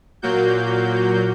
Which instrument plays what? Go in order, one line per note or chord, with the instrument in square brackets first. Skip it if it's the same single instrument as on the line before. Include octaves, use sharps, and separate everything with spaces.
[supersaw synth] A#2 F#3 A#3 F#4 G6